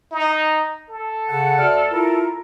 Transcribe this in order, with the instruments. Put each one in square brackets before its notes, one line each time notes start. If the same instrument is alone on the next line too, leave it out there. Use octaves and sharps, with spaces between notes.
[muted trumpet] D#4
A4
[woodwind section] C#3 F#5
D2 D5 F6
E4 F4 A#4